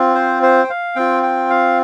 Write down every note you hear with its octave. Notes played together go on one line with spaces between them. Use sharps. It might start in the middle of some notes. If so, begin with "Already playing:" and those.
Already playing: C4 F4
C5
C5
G5
F5
C4 F4 G5
G5
F5